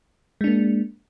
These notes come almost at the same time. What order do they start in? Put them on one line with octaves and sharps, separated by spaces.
G#3 D4 A#3